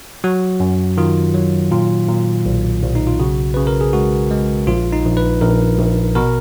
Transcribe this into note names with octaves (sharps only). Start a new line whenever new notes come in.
F#3 F#4
F#2
D#3 F4
F#3
A#2 F4
A#2
B1
B1
D#4
F4
C#3 F#4
C#3 B4
A#4
G#4
G#3 F#4
G#3
A#1 F4
D#4
A#1
B4
A#1 A#4
A#1
B2 A#4